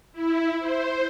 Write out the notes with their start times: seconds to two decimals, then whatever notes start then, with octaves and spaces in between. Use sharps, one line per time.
0.12 E4
0.59 C5